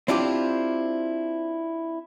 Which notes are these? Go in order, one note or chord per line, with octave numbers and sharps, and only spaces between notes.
C4 D4 E4 F4 G4